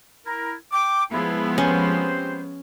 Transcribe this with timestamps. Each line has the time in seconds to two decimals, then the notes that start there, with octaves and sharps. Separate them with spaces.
0.25 E4 A#4
0.72 G5 D6
1.11 F3 G#3 B3 E4
1.58 C4 C#4 G4 C5